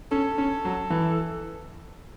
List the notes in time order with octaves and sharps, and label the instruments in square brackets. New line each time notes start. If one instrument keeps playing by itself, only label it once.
[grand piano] C#4 [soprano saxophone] A4
[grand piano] C#4
F#3
E3